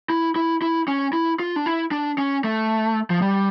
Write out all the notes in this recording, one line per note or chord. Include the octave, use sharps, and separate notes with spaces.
E4
E4
E4
C#4
E4
F4
D4
E4
D4
C#4
A3
F3
G3